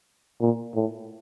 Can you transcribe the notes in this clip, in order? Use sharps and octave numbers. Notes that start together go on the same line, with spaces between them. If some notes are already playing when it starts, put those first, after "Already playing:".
A#2
A2